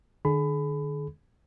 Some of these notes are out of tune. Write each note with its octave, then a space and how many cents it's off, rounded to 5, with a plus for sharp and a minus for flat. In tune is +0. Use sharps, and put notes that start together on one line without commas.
D3 +40 G#4 +40 B5 +20